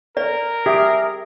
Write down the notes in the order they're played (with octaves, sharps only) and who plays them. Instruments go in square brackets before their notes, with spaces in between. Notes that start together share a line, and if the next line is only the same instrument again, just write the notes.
[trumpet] A#4 [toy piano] D5
[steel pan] G4 [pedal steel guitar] G#4 E5 D#6